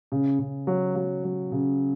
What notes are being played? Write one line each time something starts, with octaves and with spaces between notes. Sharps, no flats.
C#3
C#3
F#3
F#3
F#3
C#3